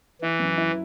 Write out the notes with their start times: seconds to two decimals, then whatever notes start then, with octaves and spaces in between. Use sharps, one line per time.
0.22 E3 E4
0.40 F#2
0.57 E4